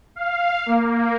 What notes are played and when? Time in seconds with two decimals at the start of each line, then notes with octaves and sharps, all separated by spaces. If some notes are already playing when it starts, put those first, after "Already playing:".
0.16 F5
0.66 A#3